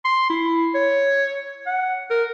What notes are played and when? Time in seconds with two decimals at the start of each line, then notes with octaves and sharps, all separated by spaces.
0.05 C6
0.30 E4
0.75 C#5
1.66 F#5
2.10 A#4